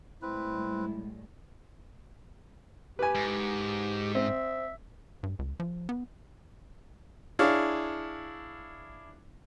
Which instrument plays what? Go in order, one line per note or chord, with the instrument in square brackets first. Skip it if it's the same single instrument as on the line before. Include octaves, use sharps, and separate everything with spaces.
[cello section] A2 G3 G#3 [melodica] C4 B4 [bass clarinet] E4
[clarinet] G4 [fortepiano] B4 G#5
[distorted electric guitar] G#2
[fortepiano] C4 [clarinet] E5
[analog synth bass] G2
C#2
F3
B3
[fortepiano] D4 E4 G#4 C#5 F5